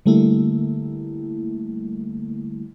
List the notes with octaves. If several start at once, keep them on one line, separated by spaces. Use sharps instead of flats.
D3 G3 A3 A#3 E4